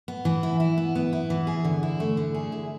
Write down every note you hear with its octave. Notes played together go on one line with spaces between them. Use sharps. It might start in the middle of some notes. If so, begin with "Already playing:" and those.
B3
E3
E4
E4
B3
B3
E4
E3
G#4
D3
E4
A3
D3
G#4
E4